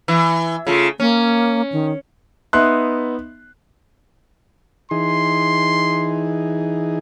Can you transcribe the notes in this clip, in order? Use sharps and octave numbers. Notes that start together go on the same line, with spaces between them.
E3
C#3 A3 F4
A#3 C#4
D#3
B3 D#4 E5 C6 F#6
E3 D#4 G#4 C6